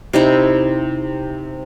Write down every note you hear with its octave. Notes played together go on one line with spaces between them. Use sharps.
C3 D#4 E4